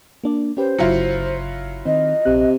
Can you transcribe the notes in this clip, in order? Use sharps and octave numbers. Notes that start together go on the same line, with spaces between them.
A#3 D4 D5
C#4 G4 B4 C5
G1 C#3 F#3 E4 F4 C#7
D#3 C4 D#5
A#1 C3 F#6